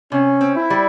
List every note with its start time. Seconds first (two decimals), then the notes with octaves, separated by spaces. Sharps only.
0.12 C3 C#4
0.41 C4
0.56 E4
0.70 G3